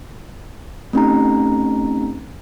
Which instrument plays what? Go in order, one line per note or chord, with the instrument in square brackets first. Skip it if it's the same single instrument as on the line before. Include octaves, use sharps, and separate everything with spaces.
[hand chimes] A3 C4 C#4 D#4 G4 A#5